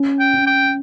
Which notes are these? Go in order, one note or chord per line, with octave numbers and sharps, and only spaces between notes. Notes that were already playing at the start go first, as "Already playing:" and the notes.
Already playing: C#4
G5
C#4
G5